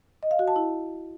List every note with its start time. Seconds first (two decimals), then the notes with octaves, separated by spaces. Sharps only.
0.23 D#5
0.31 F5
0.39 F#4
0.48 A5
0.56 E4